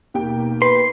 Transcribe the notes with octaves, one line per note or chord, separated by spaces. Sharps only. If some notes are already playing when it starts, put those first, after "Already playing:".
D#2 B2 A#3 G4 G5
B4 C6